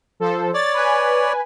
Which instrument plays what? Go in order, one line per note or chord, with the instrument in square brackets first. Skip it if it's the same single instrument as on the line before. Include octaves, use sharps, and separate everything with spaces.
[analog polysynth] F3 A4 C5
[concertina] C#5 D5 [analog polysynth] A6
[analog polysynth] B4 G#5